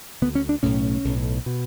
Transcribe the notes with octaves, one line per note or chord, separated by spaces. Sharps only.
D2 D3 B3
C#4
D4
B1 A2 C#4
B1 A2
B2